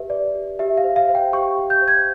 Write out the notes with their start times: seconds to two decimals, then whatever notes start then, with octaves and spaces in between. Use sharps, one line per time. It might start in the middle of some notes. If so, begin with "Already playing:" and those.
Already playing: G4 B4 E5
0.10 D5
0.35 G4
0.59 G4 E5
0.78 F5
0.84 C5
0.96 F5
1.09 C5
1.15 G5
1.33 G4 C#6
1.58 G4
1.70 G6
1.82 C5
1.88 G#6